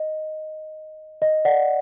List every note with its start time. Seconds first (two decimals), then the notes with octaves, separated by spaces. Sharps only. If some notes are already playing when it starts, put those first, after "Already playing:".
Already playing: D#5
1.22 D#5
1.45 D5 F#5